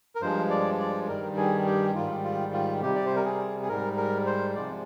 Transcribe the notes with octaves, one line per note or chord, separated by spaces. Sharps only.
A#4
G2 F3 G#3 C5
D5
D5
G2 D#3 G3 A#4
G#4
G4
G#2 D#3 G3 F4
F4
F4
C3 G3 G4
D5
C5
A#4
G#4
G#4
G#2 G3 A#4
A#4
C5
C3 F3 G#3 D5